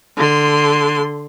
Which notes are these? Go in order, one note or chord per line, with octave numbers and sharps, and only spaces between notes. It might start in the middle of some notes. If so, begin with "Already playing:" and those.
D3 C6